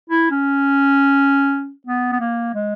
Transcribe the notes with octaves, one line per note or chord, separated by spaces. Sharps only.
E4
C#4
B3
B3
A#3
G#3